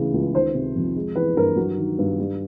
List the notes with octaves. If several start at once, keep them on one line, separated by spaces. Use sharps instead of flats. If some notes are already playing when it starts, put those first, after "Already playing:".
Already playing: D2 C#3 E3
C#2
D#3 C5
C3
F2
G#3
E3 B4
G2 A#4
F#3
D#3
G2
G3